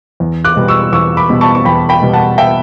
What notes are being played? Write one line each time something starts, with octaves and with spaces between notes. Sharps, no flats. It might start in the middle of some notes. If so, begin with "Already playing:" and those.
E2
D6 F#6
B2 G3 B3
C#6 E6
E2 C#6 E6
B5 D6
B2 G3 B3
A5 C#6
C#6
E2 G5 B5
G5 B5
B2 G3 B3
F#5 A5
E5 G5